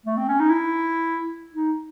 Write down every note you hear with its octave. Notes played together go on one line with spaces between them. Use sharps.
A3
C4
C#4
D#4
E4
D#4